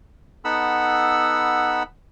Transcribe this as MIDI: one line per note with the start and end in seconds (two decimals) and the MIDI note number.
0.45 1.83 59
0.45 1.83 63
0.45 1.83 69
0.45 1.83 78
0.45 1.83 83
0.45 1.83 88